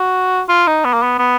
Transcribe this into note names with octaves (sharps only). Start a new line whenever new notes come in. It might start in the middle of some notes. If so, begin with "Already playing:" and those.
Already playing: F#4
F4
D#4
B3
A#3
B3
B3